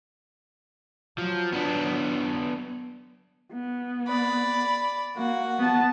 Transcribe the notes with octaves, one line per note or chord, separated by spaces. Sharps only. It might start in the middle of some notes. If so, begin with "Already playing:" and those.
F3 F#3
B3 D4
B3
D5 B5
A#3 F#4 F#5
B3 A5